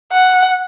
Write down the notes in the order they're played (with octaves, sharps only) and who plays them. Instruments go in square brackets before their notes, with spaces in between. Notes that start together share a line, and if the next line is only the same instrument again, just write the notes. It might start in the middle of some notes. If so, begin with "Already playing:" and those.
[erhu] F#5